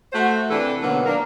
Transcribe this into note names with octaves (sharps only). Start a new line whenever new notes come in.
A3 F#4 C5
C3 E3 D4 A4
B2 D3 D#3 F#3 A#3 B3
A#3 D4 A#4